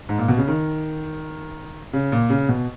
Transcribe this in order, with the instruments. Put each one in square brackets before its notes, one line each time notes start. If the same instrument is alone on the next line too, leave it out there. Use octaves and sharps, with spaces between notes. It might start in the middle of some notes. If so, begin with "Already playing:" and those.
[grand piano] G#2
A#2
B2
C#3
D#3
C#3
A#2
C#3
B2